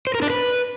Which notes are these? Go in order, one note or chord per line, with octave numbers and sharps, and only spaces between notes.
C5
A#4
D4
B4